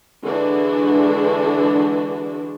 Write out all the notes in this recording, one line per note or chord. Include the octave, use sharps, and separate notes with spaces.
D3 E3 G#3 D4 F#4